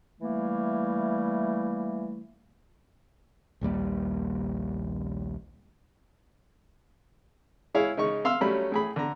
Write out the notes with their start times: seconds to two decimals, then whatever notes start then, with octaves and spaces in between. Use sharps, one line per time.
0.20 E3 G3 A3 A#3
3.61 A#1 D#2 G3 A#3
7.74 G#3 E4 G#4 C#5 F5
7.97 C#3 G#3 D#4 C#6
8.25 E5 F5 C6 E6
8.41 F#3 G3 A3 C#4 B5
8.72 A2 G#4 B5
8.96 D3 A#5